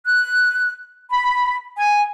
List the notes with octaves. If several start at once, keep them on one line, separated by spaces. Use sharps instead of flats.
F#6
B5
G#5